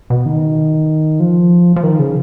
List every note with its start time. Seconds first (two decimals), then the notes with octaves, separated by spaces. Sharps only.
0.10 B2
0.26 D#3
1.20 F3
1.76 F3
1.83 D#3
1.99 C#3